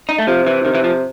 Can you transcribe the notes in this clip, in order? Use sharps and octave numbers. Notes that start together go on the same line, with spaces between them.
D#4
A3
C3 F3
E3
C3 D#3
E3
F3